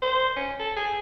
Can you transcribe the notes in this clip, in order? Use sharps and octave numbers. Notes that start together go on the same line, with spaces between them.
C5
C#4
A4
G#4